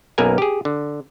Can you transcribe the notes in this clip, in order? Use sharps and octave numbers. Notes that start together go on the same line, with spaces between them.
B1 F#2 A#3 A#4 B4 G#5
G4 G#4
D3